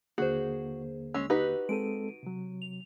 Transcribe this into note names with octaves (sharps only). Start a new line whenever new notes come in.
D#2 D3 A#3 F#4 G#4 C5
G#3 C#4 E6
D#4 F#4 G4 B4
G#3 C4 A4 D7 D#7
C3 F#3
F7